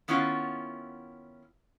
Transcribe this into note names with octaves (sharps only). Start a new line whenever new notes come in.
D#3 B3 C#4 E4 F4